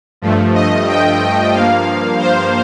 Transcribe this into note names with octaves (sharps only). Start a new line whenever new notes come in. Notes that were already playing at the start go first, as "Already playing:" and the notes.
G2 F3 A3
D#5
G5
G2 F3 A#3 F5
C5